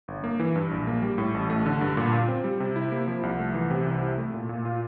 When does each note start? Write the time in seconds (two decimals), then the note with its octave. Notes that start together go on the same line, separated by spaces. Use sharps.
0.08 G1
0.24 A#3
0.40 E3
0.55 G2
0.71 A#1
0.87 A#3
1.02 G3
1.18 A2
1.34 A1
1.50 A3
1.66 D3
1.81 G2
1.97 A#2
2.13 F4
2.28 C4
2.44 G3
2.60 C3
2.76 E4
2.92 A#3
3.08 F3
3.23 C2
3.39 A3
3.54 E3
3.71 C3
3.86 C2
4.02 E4
4.18 A3
4.34 A#2
4.49 A#2
4.65 F4